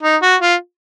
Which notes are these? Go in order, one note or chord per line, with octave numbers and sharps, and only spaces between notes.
D#4
F#4
F4